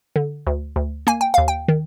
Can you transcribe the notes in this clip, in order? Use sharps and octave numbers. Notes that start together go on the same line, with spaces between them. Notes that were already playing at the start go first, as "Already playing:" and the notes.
D3
D2
D2
A#3 G#5
G5
D#2 F5
G5
D#3